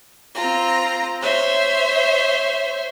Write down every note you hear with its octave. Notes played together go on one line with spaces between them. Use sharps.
C4 F4 A#5
C5 C#5 E5